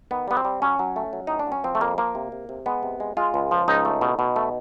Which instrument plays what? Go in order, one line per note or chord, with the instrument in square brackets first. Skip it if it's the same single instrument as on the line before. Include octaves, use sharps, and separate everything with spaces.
[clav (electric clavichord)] D#3 B3
G3 B3
C4
G3
F#3 C#4
F#3
A3
F#3
A2 D#4
D4
F#3 C#4
F3 C4
A3
F2 A#3
F3 A#3
C3
C3
C3
G#3 B3
C3
G#3
G#3 F4
C#2
F3
C#2 D#4
A3
B2
B2
A3